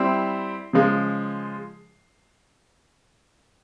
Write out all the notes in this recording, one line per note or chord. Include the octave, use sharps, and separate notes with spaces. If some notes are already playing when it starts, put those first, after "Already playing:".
Already playing: G3 C4 E4
C#3 F3 G#3